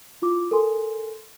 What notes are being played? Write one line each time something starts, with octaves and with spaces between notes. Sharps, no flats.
E4 F4 D6
A4 A#4 G#5 C6